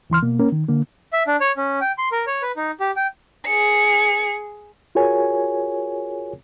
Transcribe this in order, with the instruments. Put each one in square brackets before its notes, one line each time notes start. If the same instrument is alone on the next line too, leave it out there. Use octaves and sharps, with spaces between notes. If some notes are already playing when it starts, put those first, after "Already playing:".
[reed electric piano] C#2 E3 C6 F6
B2 A#3
A#3 C#4 A#4
D#3
D3 A#3
[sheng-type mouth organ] E5
D4
C#5
C#4
G5
C6
A#4
C#5
B4
D#4
G4
G5
[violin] G#4 C#7
[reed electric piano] F4 F#4 G#4 A#4 C#5 G#5